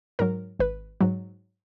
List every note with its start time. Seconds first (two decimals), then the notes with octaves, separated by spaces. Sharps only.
0.19 G#2 F#3 A#4
0.59 G#1 B4
1.01 G#2 F#3